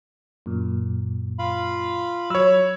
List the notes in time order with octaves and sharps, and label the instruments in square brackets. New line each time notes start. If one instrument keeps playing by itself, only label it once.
[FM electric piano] F#2 A#2
[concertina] F4 F5 B5
[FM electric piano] F#3 [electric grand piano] C#5 E6 [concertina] B5